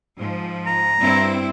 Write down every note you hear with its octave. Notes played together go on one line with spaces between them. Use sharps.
G#2 F3
A#5
G2 C4 E4